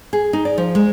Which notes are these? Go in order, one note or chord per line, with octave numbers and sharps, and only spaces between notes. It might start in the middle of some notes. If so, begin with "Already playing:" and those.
G#4
D#4
D5
F3
G#3